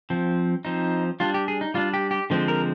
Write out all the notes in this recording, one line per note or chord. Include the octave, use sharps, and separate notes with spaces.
F3 C4
F3 C4 D#4
G3 D4 F4
G4
G#4
D#4
G3 D4 F4
G4
G4
D3 F3 G#3 C4
A#4